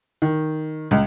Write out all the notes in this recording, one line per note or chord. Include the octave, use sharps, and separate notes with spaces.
D#3
C#2